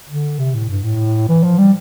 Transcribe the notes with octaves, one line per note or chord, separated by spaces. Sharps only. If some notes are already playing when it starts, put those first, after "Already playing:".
D3
C3
A2
G2
A2
E3
F3
G3